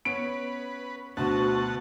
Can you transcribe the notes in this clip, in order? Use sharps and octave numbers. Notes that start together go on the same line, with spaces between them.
B3 C#4 B4 D7
D2 B2 F#4 F#5 A5